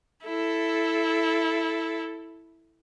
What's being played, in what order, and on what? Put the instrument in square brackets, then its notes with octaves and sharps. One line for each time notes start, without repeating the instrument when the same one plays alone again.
[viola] E4 A4